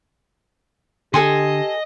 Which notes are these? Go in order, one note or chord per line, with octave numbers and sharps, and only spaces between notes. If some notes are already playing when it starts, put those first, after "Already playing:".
D3 G4 A4 D#5 G#5 C6